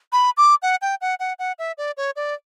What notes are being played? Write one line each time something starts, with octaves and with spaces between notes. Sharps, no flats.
B5
D6
F#5
G5
F#5
F#5
F#5
E5
D5
C#5
D5